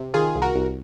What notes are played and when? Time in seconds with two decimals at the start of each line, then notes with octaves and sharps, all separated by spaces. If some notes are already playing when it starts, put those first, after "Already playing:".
Already playing: C3
0.14 D#3 F4 G#4
0.35 C2
0.42 F#4 A#4
0.56 C2